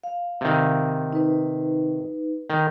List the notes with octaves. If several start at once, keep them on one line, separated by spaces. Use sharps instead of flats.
F5
C3 D#3
D#4 B4
D#3